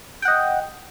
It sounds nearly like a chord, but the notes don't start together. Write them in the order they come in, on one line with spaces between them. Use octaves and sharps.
G5 F#5 D#5